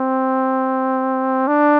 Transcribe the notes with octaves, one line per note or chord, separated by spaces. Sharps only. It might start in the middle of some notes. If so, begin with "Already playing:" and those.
Already playing: C4
D4